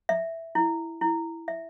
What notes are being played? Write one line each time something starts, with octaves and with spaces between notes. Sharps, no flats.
E5
E4
E4
E5